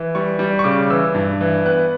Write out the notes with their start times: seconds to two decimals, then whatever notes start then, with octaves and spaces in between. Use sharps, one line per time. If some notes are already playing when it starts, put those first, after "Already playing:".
Already playing: E3
0.15 G3 C#6
0.39 G3
0.59 C#6
0.64 C#3 D6
0.90 E3 E6
1.15 G2
1.41 E3
1.65 B3 F#6